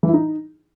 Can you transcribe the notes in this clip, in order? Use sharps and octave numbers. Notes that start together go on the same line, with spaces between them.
E3
E4
D#4